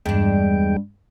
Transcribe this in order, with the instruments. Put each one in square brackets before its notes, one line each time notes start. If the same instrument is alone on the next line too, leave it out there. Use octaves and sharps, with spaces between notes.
[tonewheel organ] E2 G#3 G5 [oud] G2 D4